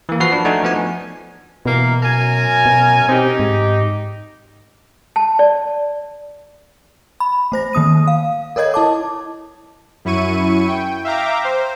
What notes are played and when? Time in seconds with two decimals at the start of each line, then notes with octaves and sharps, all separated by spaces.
0.09 E3 A#3
0.20 F3 F#4 B4 C7
0.32 D4
0.45 A3 D4 D#4 F#4 G#5
0.63 F3 B3 G#5
1.66 B2 E3 A#3 A#4
2.03 F#2 A#4 G#5
2.66 B2
3.09 C4 D#4 G4
3.40 G#2
5.16 A5
5.39 D5
7.20 B5
7.52 A3 C5 A#6
7.73 D#3 A#3 D#6 D#7
8.08 F5
8.56 A4 A#4 C#5 D#5 G#6
8.74 E4 A5 D6
10.05 F#2 E4 C#6 D#7
10.68 G5
11.04 E5 F5 G5 A#5 D6
11.44 C5